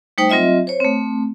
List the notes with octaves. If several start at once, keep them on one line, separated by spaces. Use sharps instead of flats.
G3 A3 D#4 C5 G5 D#6
F#3 C4 F4 D#5 E5
C5 C#5
A3 C4